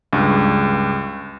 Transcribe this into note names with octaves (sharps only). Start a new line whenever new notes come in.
C#2 G2